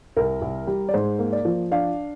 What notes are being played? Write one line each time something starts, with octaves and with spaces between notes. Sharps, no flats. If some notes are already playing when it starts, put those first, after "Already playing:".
C2 A#4
C2
G3
D5
G#2 C5
A#3
D5
F3
D4 F5